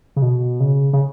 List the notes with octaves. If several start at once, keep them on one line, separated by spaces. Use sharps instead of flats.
C#3
B2
C#3
C#3